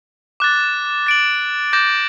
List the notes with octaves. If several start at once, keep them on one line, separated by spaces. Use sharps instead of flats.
D6 F#6 A6
A6 D7 F#7
D6 G6 A#6